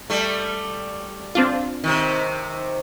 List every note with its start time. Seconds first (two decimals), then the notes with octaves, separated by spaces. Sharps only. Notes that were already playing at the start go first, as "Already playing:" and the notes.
0.10 G3 A3
1.35 C4 D4 F4
1.84 C3 D#3